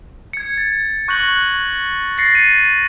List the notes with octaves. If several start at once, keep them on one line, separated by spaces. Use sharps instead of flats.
G#6 C#7
A6
C#6 F#6 G6 A#6 F#7
A6 A#6 C7 C#7
D#7